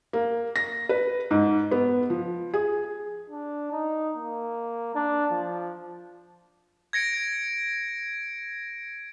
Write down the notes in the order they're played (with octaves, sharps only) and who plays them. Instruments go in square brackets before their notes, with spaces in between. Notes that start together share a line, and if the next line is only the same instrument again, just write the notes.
[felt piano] A#3
A#6
B4
G#2
B3
F3
G#4
[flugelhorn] D4
D#4
A#3
D4
F3
[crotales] G#6 A#6 C#7 D7